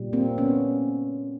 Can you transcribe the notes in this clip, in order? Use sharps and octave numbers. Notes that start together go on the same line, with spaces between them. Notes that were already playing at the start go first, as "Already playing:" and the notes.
Already playing: A#2 G3
A#3 C4
B3 C#4